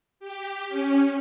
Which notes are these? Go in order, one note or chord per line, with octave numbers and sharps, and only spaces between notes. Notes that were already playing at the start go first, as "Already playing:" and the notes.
G4
C#4